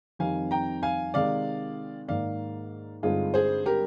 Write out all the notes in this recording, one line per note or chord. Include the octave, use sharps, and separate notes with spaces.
F2 D#3 G3 C4 D#4 F5 G#5
G5 A#5
F5 G#5
C3 D#3 G#3 D5 F5
G#2 D#3 A#3 D5 F5
G2 D3 G#3 C4 D#4 F4 G#4
G#4 C5
G4 A#4